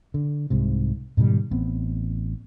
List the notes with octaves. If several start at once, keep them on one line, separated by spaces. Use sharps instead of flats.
D3
C2 G#2 C3
G#2 B2 D#3 G3
A1 B3 C4